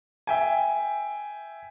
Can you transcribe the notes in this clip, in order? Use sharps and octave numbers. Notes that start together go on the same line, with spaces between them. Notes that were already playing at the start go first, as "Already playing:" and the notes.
E5 G5 G#5